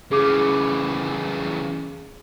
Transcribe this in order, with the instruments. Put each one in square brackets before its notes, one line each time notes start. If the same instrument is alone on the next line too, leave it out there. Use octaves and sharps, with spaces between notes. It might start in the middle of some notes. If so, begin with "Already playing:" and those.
[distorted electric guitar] C#3 E3 [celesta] G#4 D6